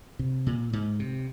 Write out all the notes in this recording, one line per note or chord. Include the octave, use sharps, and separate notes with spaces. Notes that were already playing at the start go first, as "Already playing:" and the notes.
C3
A#2
G#2
C3